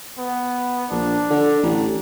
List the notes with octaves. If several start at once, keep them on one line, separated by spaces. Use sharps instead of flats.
B3
A#1 D4
D3
A1